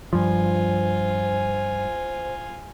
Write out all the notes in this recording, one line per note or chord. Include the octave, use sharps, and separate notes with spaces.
G2 F3 F4 C5 G#5